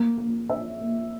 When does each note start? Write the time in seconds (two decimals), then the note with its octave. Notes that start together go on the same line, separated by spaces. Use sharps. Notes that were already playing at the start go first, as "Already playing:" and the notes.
Already playing: A#3
0.18 A#3
0.49 E5
0.81 A#3